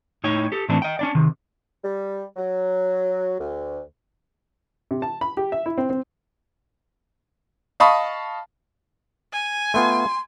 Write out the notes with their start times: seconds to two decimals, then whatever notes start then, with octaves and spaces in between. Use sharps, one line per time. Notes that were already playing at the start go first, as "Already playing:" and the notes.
0.24 A2 D#4 C#5 G5
0.52 G4 A4
0.69 A2 E3 A3 C4 D4
0.82 D#5 G5
0.99 C#4 D4 D5
1.15 C3 D#3
1.84 G3
2.37 F#3
3.40 D2
4.91 C3
5.02 A5
5.21 B5
5.37 G4
5.52 E5
5.66 E4
5.78 C4
5.90 C4
7.80 D#5 F5 A5 B5 C#6 D#6
9.33 G#5
9.74 A3 B3 F4 C6